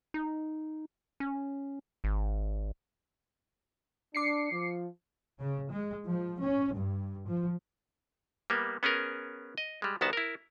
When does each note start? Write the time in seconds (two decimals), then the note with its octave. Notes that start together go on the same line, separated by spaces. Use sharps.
0.14 D#4
1.20 C#4
2.04 G#1
4.15 D4 D6 C7 C#7
4.52 F3
5.41 C#3
5.71 G#3
6.06 F3
6.42 C#4
6.74 G2
7.27 F3
8.50 G3 A#3 B3
8.83 B3 C#4 G#4 A#4
9.58 D#5
9.82 G3 G#3
10.01 C2 D#3 B3 F#4 A5
10.13 E4 A#4